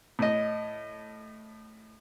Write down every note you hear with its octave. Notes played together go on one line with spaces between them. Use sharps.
A2 D#5